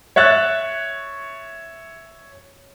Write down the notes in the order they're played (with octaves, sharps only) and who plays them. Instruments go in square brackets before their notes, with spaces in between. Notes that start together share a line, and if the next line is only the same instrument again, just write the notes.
[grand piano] C#5 E5 F#6 A6